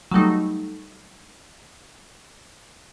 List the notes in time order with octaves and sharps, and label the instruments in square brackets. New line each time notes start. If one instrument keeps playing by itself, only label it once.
[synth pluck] F#3 G3 A3 D#4